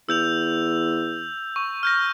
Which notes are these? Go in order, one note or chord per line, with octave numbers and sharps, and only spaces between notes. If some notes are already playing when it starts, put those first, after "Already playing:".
E2 E6 G6 F7
C#6
F6 G6 A#6